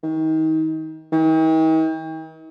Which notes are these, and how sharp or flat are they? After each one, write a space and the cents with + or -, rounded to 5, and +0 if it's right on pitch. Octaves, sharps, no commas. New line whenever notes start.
D#3 +30
D#3 +45